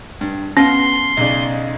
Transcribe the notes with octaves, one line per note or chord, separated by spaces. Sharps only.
G2
B3 C#4 F5 C6
B1 C#3 D5